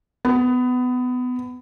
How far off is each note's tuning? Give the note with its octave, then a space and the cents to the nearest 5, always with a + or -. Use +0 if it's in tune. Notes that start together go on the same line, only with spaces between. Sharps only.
B3 +20